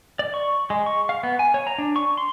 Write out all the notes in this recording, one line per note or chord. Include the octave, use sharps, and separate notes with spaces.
D5
C#6
G#3
C#6
F5
B3
G#5
C#5
A#5
D4
C#6
C6